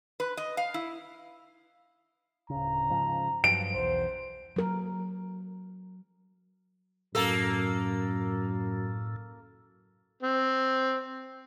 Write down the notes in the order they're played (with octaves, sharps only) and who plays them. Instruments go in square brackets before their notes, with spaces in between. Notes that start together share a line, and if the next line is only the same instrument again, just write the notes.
[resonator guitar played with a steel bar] B4
D#5
F5
E4
[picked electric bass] D1 C#3 [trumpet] A#5
[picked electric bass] G#2 C#3 F3
[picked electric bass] G2 F3 F#3 [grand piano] D7
[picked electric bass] B1 E2 [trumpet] C5
[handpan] F#3 A#4
[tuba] F#2 [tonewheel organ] A2 [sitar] A#3 A4
[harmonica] C4